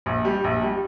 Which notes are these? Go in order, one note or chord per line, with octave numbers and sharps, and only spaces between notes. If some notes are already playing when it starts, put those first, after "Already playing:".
A#1
G3
A#1
G3